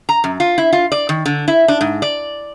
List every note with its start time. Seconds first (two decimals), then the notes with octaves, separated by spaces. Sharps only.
0.09 A#5
0.24 F#2
0.40 F4
0.58 E4
0.73 F4
0.92 D5
1.09 D#3
1.26 D3
1.48 E4
1.68 D4
1.81 G#2
2.02 D5